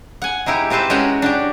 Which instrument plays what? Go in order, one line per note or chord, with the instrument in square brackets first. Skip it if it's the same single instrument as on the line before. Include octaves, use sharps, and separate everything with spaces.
[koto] F#5 G#5
G#3 D#4 E4 G4
C4 G4 B4 C5 A5
G#3 C#4 F#4 C#5 G5 A#5
D4 F#4 G4